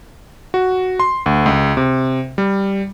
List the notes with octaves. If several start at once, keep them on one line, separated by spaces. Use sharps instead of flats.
F#4
C6
D2
C#2
C3
G3